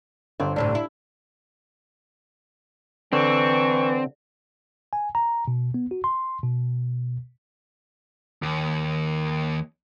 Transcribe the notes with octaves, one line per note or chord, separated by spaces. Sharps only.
G1 C4
D2 A2 C3 D4
E4
D3 E3 C4 C#6
G#5
A#5
B2
B3
F#4
C6
B2
D#2